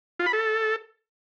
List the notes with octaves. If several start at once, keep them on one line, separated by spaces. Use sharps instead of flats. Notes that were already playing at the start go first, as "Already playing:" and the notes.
F4
B5
A4